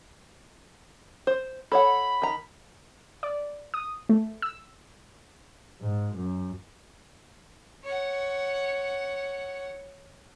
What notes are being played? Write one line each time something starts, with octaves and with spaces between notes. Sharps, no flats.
C5
A4 C#5 F#5 B5
D#3 A#5
D5
D#6
A3
E6
G#2
F#2
C#5 F#5